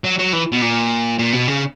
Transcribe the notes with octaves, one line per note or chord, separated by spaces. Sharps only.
F#3
F#3
E3
B2
A#2
A#2
B2
C#3